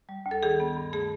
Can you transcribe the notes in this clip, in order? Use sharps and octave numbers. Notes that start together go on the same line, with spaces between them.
G3
D2
A4
D#3 G#4
B3
G2
A3 G#4